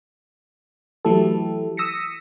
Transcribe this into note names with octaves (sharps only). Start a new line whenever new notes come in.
E3 F#3 A3 E4 G4 A4
D#6 E6 A#6 B6 C#7